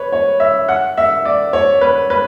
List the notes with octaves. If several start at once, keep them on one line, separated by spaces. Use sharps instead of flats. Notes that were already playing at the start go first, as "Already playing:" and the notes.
Already playing: B4 C#5
C#5
E5
F#5
E5
D5
C#5
B4
B4